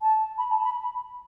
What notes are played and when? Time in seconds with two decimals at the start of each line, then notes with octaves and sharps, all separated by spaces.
0.02 A5
0.38 B5
0.50 A5
0.64 B5